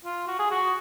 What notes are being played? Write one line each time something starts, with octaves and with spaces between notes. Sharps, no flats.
F4
F#4
G#4
F#4